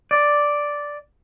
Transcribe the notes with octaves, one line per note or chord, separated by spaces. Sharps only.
D5